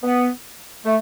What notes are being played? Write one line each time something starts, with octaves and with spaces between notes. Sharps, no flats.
B3
A3